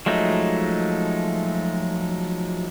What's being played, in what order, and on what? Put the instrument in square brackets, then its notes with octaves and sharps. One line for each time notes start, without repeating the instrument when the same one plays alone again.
[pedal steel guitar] F3 F#3 G#3 A3 D#4